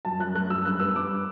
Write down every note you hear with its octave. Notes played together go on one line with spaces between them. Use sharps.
F#2 A5
F#2 F#6
A3 F#6
F#2 E6
G2 F#6
B3 E6
G2 D6